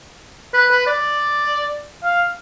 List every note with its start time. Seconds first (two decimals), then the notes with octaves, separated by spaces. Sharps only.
0.54 B4
0.71 B4
0.87 D5
2.04 F5